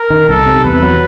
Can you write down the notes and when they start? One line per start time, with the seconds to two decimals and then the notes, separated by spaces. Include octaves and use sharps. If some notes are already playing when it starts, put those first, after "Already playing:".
Already playing: A#4
0.10 D#3
0.29 C2 A4
0.46 C3
0.64 E2 B4
0.82 F#3